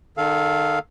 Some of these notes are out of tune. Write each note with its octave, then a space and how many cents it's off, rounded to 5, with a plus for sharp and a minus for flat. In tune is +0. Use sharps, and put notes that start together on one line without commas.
D#3 -35 A4 -15 F5 +0